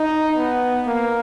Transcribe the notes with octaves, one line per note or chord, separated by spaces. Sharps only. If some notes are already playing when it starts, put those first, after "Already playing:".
Already playing: D#4
B3
A#3